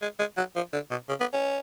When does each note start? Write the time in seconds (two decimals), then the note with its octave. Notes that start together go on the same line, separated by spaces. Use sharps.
0.02 G#3
0.19 G#3
0.37 F#3
0.55 F3
0.73 D3
0.90 B2
1.09 C#3
1.20 B3
1.33 C#4